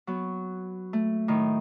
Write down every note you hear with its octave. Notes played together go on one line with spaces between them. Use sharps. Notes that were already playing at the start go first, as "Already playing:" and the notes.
F#3 B3
A3
A2 D#3